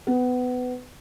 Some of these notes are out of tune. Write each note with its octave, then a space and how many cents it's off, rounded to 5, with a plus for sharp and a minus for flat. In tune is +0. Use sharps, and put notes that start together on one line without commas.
B3 +20